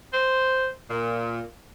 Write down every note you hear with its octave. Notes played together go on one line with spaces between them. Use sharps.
C5
A#2